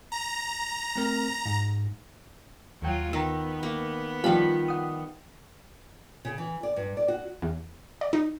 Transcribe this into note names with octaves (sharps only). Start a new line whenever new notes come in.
A#5
A3 C4 A#4
G#2
D#2 F#3 F4 G5
D#3 B3 A#5 E6
A#3
D#3 F3 G3 F4 B5
F#5 D#6
C#3
E3
D5
G2
D5
F#4
E2
D5
D#4